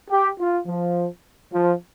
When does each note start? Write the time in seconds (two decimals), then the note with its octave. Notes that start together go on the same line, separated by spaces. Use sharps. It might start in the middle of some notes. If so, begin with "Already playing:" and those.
0.10 G4
0.40 F4
0.67 F3
1.53 F3